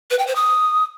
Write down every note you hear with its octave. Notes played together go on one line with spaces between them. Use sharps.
B4
G5
C5
D#6